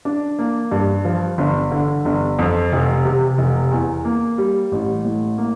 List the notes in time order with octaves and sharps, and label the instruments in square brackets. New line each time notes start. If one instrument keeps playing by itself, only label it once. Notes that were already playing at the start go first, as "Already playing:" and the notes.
[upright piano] D4
A#3
G2
F3
G1
D3
G1
F2
F1
C3
F1
E2
A#3
G3
A1
A2
A#3